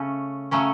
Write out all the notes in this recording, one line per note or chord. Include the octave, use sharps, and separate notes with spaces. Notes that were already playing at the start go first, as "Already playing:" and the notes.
Already playing: C#3 A3 C#4
C#3 F#3 A3 C#4